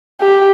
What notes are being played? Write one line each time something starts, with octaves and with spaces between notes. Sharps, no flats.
G4